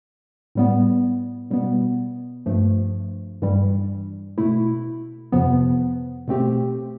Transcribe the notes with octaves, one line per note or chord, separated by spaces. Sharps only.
A2 G3 B3
B2 G3 B3
G2 F3 A3
G2 E3 G3
B2 A3 E4
F2 C3 F3 B3
B2 A3 C4 G4